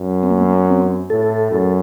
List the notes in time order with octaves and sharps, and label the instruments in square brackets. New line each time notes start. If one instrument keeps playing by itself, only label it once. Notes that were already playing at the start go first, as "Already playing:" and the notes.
Already playing: [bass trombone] F#2
[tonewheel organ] C4
A#3
C4
[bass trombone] A2 [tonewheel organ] A4
[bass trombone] F#2